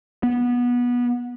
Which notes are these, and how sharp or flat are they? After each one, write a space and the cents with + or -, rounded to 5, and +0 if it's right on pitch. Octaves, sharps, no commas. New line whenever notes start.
B3 -20